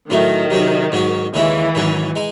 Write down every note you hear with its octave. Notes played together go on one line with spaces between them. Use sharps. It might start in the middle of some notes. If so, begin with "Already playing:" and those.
A2 D#3 F#3 A3 D#4
C3 F#3 C#4 G#4
G#2 F#3 C#4 F#4
D#2 C#3 E3 G#3 C#4 E4
G#2 D#3 F#3 C#4 G#4
G#3 D#4